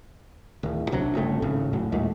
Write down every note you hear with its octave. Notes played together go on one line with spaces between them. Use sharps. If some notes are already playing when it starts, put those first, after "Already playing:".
D1 D#3
B1 C3 F#3 D4
G1 C#3 A3 C4
G#1 A2 C#3 A3
F1 A2 F#3
D#2 A#2 G#3 A3